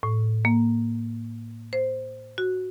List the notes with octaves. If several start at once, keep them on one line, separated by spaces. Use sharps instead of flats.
A2
A#3
C5
F#4